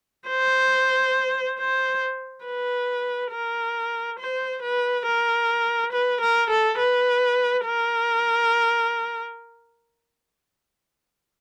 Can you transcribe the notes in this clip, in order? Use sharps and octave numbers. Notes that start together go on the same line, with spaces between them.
C5
C5
B4
A#4
C5
B4
A#4
B4
A#4
A4
B4
A#4